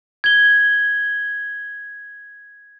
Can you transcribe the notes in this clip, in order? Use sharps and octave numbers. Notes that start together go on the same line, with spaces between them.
G#6 G7